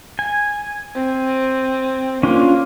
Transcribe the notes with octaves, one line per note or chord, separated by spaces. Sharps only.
G#5
C4
A#3 C#4 D4 F4